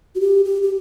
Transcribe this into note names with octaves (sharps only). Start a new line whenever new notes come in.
F#4
G4
G4
G4